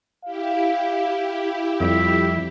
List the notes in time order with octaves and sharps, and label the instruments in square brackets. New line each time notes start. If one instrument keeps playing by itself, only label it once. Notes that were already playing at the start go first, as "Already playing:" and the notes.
[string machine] E4 G4 [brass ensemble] F5
[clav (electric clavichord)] F2 G3 [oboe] E5